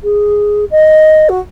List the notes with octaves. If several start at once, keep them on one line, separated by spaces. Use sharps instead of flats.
G#4
D#5
F#4